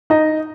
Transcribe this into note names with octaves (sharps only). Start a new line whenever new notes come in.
D#4 D#5